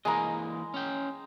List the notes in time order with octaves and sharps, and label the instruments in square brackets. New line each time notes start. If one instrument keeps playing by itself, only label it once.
[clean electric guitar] E3 A#3 D#5 [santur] G#3 A#5
[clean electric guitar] C#4 G5